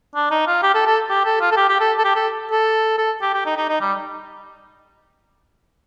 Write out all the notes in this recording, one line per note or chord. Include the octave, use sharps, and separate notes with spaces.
D4
D#4
F4
G4
A4
A4
G4
A4
F4
A4
G4
G4
A4
A4
G4
A4
A4
A4
G4
G4
D#4
D#4
D#4
G3